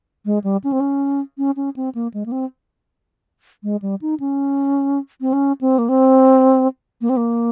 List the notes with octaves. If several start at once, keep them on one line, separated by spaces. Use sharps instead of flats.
G#3
G3
C#4
C4
C#4
C#4
C#4
C4
A#3
G#3
A#3
C4
G#3
G3
D#4
C#4
C4
C#4
C4
A#3
C4
A#3
C4
A#3